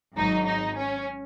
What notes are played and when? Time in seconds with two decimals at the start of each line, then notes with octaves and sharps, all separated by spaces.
0.17 G#1 G#2 F#3 D#4
0.47 D#4
0.77 C#4